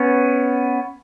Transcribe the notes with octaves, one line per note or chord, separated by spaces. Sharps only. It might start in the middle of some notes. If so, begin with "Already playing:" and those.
Already playing: B3 C#4